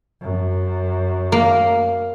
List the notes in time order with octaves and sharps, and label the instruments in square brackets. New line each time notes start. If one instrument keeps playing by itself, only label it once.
[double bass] F#2
[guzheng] A#3